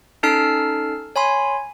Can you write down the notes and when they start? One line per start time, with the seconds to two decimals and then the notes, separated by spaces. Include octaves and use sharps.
0.23 C#4 D#4 A4 A5 F6 C7
1.16 C#5 G#5 B5 C6